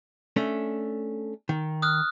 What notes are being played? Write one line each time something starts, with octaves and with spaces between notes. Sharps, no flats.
A3 C#4 D4
D#3
D#6 F6 F#6